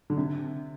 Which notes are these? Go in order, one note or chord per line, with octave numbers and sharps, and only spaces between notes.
D3
C3